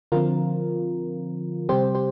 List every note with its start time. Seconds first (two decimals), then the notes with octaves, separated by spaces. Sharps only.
0.12 D3 F3 C4 F4 A#4
1.69 C3 G3 C4 G4 C5
1.95 G4 C5